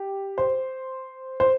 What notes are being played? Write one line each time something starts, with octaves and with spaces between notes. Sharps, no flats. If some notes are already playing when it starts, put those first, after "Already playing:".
Already playing: G4
C5
C5